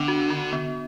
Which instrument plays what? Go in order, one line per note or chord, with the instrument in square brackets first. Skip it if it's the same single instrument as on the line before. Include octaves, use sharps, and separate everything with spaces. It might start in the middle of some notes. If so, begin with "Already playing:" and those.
Already playing: [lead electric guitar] D3 [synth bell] B3 D4
[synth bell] F#4
F#4
B3